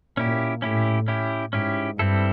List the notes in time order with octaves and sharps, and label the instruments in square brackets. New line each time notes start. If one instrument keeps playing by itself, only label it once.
[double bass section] A#2 [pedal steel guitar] C#4 E4 G4
[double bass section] A2 [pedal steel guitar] C#4 E4 G4
[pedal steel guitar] C#4 E4 G4
[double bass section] G#2 [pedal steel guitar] C#4 E4 G4
[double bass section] G2 [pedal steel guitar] G3 C4 E4 A4